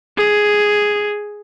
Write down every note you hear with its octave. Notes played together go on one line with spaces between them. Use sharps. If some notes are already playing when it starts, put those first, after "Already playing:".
G#4